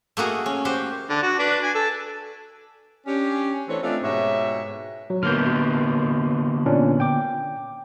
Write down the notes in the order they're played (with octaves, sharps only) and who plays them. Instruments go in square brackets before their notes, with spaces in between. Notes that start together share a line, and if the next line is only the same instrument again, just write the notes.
[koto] A3 A#3 F#4 G#4
C#4
F#4 G4 C5
[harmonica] D3
F#4
D4 B4
G#5
A4
[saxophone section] C#4 D4 G4
E3 A3 C4 D4 A4 C#5
A3 C4 D4 D#4 F4
G#2 B2 G4 C#5 E5
[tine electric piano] F#3
[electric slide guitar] D3 A#3 B3 [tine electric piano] F6 G6
[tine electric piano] A#2 C#4 D4
G5 D6